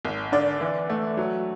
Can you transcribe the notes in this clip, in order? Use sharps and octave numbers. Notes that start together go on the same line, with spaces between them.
G#1
D3 D5
E3
A3
F#3